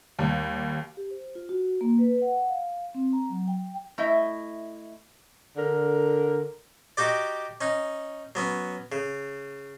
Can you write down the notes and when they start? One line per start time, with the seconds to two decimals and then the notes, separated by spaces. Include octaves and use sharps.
0.19 D#2 G3
0.97 G4
1.11 C5
1.35 F4
1.49 F#4
1.81 A#3
1.99 B4
2.22 F#5
2.49 F5
2.95 C4
3.13 A#5
3.29 F#3
3.48 G5
3.98 A3 E4 D#5 E5
5.56 D3 A#4
6.97 D#4 F#4 G4 D5
7.61 C#4 D#4
8.35 F#3 B3 C#4
8.92 C#3